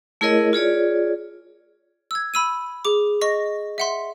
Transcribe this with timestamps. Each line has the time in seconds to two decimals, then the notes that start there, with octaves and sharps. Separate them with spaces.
0.21 A3 E4 G#4 A#4 C#5 D#5
0.53 F4 G#4 C#5 D5
2.11 E6 G#6
2.34 B5 E6 D#7
2.85 G#4 D6
3.21 D#5 C#6 A#6
3.78 E5 F#5 C6